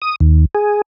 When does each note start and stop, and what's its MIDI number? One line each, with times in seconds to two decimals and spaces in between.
0.02 0.16 87
0.20 0.45 39
0.55 0.81 68